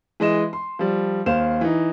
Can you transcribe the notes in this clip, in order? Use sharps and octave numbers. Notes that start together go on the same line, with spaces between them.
E3 G#3 D#5 E7
C6
F3 G3
D#2 C5 F5 E7
E3 D#4